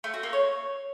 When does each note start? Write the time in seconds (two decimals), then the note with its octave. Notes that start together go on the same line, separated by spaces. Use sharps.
0.04 A3
0.14 F#4
0.23 A#3
0.33 C#5